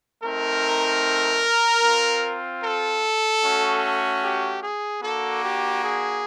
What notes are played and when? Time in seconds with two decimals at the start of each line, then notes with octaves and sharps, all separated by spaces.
0.23 A3 C4 D#4 A#4
1.83 C4 F4
2.62 A4
3.42 A3 C#4 F#4
4.23 G4
4.62 G#4
5.02 A#3 D4 F#4 A4
5.42 G4
5.82 G#4